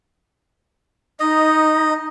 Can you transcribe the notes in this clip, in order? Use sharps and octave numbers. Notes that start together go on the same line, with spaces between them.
D#4 D#5